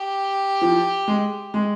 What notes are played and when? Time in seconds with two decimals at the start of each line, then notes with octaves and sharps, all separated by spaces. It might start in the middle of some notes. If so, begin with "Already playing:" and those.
Already playing: G4
0.62 F3
1.08 G#3
1.54 G#3